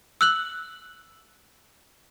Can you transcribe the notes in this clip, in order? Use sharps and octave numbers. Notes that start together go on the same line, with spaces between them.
E6 F#6 F#7